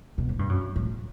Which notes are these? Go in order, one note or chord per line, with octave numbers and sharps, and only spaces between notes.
B2
A2
G2
F#2
A2